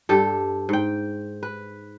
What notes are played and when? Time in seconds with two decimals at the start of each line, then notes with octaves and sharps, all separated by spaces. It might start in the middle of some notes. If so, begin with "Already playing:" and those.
0.09 G2 G4 A4
0.69 G#2 G5
1.43 B4